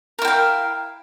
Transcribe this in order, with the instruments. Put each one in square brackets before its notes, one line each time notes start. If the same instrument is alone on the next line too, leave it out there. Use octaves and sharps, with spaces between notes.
[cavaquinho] A#4
E4
G5
F5